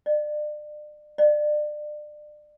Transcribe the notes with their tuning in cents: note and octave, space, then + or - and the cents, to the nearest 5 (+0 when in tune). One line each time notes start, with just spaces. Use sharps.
D5 +35
D5 +30